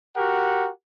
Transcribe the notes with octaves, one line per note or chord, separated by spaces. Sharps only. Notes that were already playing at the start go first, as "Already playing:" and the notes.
F#4 G4 A#4 F#5